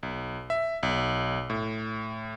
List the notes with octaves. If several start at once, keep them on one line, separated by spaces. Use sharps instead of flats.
B1
E5
B1
A2